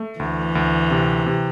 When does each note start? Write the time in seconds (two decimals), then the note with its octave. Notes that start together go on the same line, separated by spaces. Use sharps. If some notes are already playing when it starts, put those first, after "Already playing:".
Already playing: A3
0.19 D2 E3
0.55 D2
0.91 C3
1.26 C3